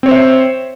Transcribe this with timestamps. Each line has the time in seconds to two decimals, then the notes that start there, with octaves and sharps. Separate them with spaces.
0.03 C4
0.06 C#5
0.09 C5
0.11 E5